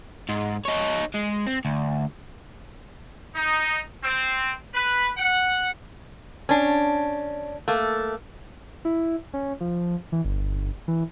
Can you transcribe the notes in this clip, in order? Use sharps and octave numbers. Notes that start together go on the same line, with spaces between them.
G#2
D#4 C#5
G#3
C4
D2
D#4
C4
B4
F#5
C#4 D4
A3 A#3
E4
C#4
F3
E3
G1
E3